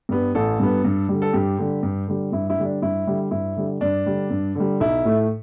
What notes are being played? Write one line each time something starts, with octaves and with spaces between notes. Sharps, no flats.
G2 G3 B3
A1 A4
G2 G3 B3
G2
D3 G3
A4
G2 G4
D3 G3
G2
D3 G3
G2 E4
E4
D3 G3
D4
G2 E4
D3 G3
G2 E4
D3 G3
G2 D4
D3 G3
G2
D3 G3
B1 E4
A2 A3